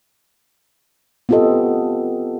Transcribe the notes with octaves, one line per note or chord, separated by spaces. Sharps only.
B3 C4 F4 G4 A4 D#5